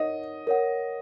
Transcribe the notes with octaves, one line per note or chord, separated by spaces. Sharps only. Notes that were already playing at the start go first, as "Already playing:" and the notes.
Already playing: D#4 A#4 C#5 D#5 F#5
A#4 C#5 F#5